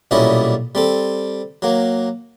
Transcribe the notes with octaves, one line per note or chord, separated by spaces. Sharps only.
B1 A#2 G3 C#4 E4 D#5
G3 C4 A4
F#3 A#3